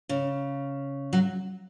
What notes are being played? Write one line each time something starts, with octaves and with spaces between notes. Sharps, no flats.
C#3
F#3